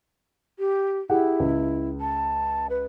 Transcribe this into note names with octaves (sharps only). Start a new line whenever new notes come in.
G4
E4 G4 G#4 F#5
C#2
A5
B4